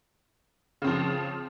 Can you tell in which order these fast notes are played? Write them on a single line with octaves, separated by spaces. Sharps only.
C#3 C4 F3